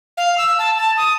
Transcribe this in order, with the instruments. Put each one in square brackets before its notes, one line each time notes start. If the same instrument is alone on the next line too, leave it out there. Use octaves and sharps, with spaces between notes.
[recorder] F5
E6
A5
A5
D#6